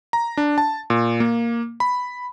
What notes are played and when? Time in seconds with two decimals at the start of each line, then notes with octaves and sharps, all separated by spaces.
0.13 A#5
0.37 D4
0.58 A5
0.90 A#2
1.20 A#3
1.80 B5